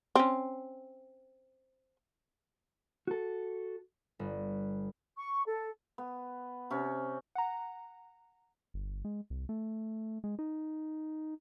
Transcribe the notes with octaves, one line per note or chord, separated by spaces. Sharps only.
C4 C#4
F#4 A4
G1
C#6
A4
B3
C3 C#4
F#5 A#5
G1
G#3
C2
A3
G#3
D#4